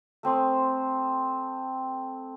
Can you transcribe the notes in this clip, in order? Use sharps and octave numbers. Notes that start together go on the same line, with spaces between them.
A3 C4 C6 D#6